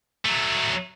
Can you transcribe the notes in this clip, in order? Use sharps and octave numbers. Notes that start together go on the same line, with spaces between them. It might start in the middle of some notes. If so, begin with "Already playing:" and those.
F#3 A3